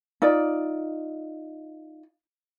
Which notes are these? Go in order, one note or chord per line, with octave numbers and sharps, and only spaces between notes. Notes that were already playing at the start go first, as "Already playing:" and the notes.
D#4 F4 D5